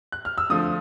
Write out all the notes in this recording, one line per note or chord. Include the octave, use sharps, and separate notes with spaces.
F#6
F6
E6
D3 F3 A3 D#6